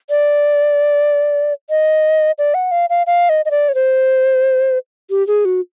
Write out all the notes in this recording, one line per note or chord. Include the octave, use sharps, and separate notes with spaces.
D5
D#5
D5
F#5
F5
F5
F5
D#5
D#5
D5
C#5
C5
G4
G#4
F#4